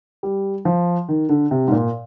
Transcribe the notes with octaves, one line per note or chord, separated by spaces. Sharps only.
G3
F3
D#3
D3
C3
G#2
A#2